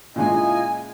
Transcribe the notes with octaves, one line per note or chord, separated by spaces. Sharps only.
A#2 C#3 G#3 E4 F4 D#5 G#5